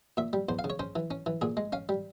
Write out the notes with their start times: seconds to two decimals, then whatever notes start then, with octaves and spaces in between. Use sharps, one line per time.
0.17 A#2 E5
0.33 G3
0.49 E2 C5
0.59 F5
0.64 C#3
0.70 C#5
0.79 C#4 C5
0.96 E3
1.11 C#4
1.26 E3
1.41 A#2 G#4
1.57 G#3
1.73 C#4 F5
1.89 G3